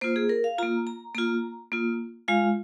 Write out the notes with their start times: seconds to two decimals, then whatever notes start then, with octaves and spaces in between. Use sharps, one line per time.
0.01 A#3 F4 C5
0.16 G#4
0.29 A#4
0.44 F5
0.58 F4 A#5
0.63 A#3
0.87 A#5
1.15 A#3 F4 A#5
1.72 A#3 F4
2.28 G#3 F4 F5